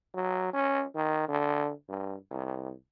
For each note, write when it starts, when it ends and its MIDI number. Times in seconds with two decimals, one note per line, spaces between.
0.14 0.49 54
0.54 0.85 61
0.95 1.28 51
1.29 1.72 50
1.89 2.15 43
2.31 2.72 36